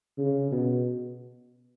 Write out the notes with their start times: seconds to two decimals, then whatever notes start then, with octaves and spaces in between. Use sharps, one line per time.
0.18 C#3
0.51 B2